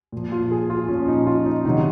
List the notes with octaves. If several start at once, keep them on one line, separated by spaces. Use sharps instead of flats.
A#2 F3
F4
G#4
F4
A#2 F3 C#4
D#4
F4
D#4
C3 D#3 F#3 D#4